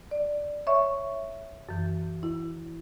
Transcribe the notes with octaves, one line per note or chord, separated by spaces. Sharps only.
D5
C#5 E5 C#6
F#2 E3
E4